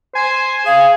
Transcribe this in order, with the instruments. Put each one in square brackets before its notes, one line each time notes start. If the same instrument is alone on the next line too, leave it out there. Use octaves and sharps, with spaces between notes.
[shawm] C5 [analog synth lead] G#5
[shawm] G#4 [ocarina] F5